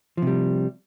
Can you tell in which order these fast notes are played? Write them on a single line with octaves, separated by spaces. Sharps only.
F3 C3 G3